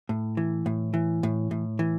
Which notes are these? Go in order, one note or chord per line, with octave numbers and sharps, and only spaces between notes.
A2
E3
A2
E3
A2
A2
E3